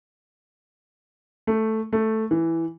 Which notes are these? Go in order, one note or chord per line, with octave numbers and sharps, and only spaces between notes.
A3
A3
E3